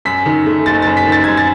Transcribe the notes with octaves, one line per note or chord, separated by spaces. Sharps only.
F#2 B6
D#3
A3
F#1 A6
F#2 A6
B6
D#3
A6
F#2 G#6
A6